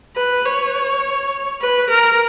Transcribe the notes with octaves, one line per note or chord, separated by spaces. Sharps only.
B4
C#5
B4
A#4